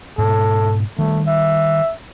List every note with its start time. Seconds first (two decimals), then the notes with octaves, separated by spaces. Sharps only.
0.18 G#2 B2 A4
0.98 D#3 G3 A3
1.27 E5